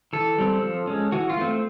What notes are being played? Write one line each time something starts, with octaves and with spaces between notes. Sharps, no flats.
E3 A4
G3 C4
F3
G#3 C#4
E3 F#4
F4
A3 C4